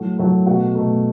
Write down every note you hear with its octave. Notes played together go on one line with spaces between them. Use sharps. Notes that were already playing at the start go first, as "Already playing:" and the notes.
Already playing: A2 F#3 A3
A2 F#3 A3
B2 A3 F#4
B2 A3